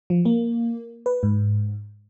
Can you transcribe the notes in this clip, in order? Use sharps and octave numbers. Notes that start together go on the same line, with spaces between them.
F3
A#3
B4
G#2